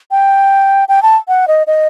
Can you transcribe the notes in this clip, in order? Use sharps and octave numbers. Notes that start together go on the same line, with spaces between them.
G5
G5
A5
F#5
D#5
D#5